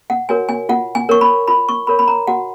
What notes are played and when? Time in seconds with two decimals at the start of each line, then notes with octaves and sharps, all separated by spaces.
0.10 F#5
0.29 F#4 A#4 C#5 G#5
0.49 G#5
0.69 F4 F#5
0.95 G#5
1.09 A#4 C#5 C#6
1.21 B5
1.48 F4 B5
1.69 C#6
1.87 A#4 C#5 B5
1.99 B5
2.08 A#5
2.27 F#4 F#5